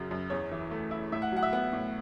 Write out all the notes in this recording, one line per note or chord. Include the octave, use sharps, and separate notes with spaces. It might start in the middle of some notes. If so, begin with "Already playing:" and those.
Already playing: F#2 C#3 F#3
F#2
E2 C#5
E3
A3
E4
A2 E5
F#5
F#3 F#5
E5
B3 F#5
A2